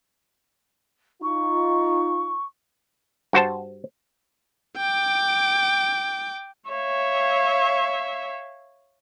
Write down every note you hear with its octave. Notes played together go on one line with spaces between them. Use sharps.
D#4 F4 C#6
G2 F#4 C5 A5
G5 D6
C#5 E5 F5